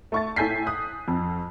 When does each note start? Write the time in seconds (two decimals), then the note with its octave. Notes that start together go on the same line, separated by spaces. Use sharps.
0.12 A3 C#6 A6
0.36 A2 A4 G#5 G6 B6 C7
0.67 D#6 F#6
1.08 F2